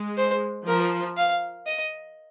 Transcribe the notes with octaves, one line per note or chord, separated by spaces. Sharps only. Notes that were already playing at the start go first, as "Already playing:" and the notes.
Already playing: G#3
C5
F3 A#4
F5
D#5